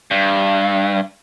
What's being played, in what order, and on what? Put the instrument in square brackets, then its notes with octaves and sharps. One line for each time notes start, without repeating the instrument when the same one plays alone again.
[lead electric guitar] G2